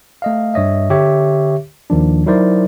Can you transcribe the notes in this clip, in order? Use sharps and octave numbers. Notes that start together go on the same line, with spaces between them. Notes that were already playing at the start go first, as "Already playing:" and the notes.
A3 D#5 F5
G2 C#5 D#5 E5
D3 G4 C#5 E5
D#2 D#3 F3 D4
F#3 D#4 E4 A#4 C5 D5